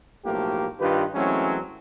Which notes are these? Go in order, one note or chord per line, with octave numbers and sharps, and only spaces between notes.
B1 A2 F3 A3 A#3 G4
G2 D#3 F4 G4 B4
E3 F#3 G#3 A3 C4 C#4